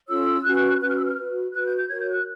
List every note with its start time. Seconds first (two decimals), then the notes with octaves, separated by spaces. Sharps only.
0.08 C#4 F4 A4 C#5 E6
0.44 C#4 F#4 B4 F#6
0.80 C#4 F#4 B4 F#6
0.89 F6
0.97 E6
1.06 F6
1.17 F#4 B4
1.53 F#4 B4 F#6
1.66 G6
1.77 G6
1.89 F#4 A#4 C#5 G#6
2.00 G6
2.11 F#6